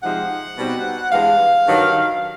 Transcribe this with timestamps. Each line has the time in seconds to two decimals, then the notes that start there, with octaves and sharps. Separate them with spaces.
0.02 C3 F3 G#3 C4 D#4 F#5
0.58 B2 G3 C4 D#4
1.12 G2 E3 G#3 F5
1.67 G2 D#3 F#3